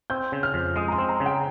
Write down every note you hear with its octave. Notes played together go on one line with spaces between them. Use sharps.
C4 G6
C#3
F6
F2
G#3 D#6
A#5
C6
C4
A#5
C#3
G5